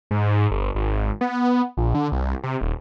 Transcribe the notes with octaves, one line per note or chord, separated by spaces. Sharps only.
G#2
G1
G#1
B3
A#1
D3
C2
C3
D#1